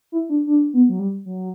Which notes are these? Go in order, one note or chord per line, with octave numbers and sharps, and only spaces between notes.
E4
D4
D4
B3
F#3
G3
F#3